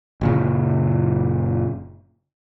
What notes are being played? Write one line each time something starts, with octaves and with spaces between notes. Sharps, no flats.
F#1 A#2 C#3